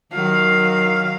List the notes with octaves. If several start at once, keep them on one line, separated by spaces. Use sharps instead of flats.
D#3 F#3 F5